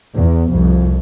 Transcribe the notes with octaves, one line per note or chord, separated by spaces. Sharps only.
E2
C2 F2